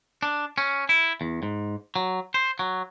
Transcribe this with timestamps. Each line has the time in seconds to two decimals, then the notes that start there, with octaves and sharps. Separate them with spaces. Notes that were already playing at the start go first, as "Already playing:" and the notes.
0.23 D4
0.58 C#4
0.89 E4
1.21 E2
1.43 G#2
1.96 F#3
2.34 C5
2.59 F#3